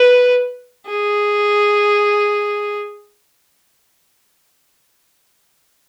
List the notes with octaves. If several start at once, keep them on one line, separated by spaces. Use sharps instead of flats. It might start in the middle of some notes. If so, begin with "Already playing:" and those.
Already playing: B4
G#4